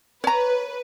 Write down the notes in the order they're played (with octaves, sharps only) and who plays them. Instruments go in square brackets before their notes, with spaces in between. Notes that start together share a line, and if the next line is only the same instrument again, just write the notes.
[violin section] B4 [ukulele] C#5 A#5